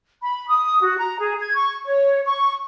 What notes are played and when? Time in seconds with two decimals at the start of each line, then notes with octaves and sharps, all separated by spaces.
0.21 B5
0.47 D#6
0.81 F#4
0.96 A#5
1.19 G#4
1.39 G#6
1.55 C#6
1.85 C#5
2.25 C#6